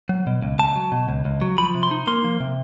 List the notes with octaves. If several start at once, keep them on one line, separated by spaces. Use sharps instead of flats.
F#3
B2
C#2
C#2 A5
F#3
B2
C#2
C#2
F#3
F3 B5
C3
C6
D#4
A#3 C6
F3
C3